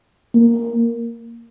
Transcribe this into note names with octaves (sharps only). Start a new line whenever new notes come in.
A#3